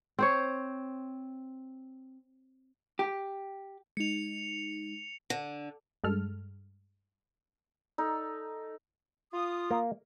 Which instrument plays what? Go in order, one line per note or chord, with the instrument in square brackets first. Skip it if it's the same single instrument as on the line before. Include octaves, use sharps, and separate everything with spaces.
[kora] C4 C5 C#5
[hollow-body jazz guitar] G4
[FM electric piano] G#3 D#4 [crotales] C#7 F7
[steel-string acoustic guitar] D3
[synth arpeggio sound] G2 G#3 A4 F6
[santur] D#4 A4
[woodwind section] F4 D#6
[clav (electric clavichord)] A#3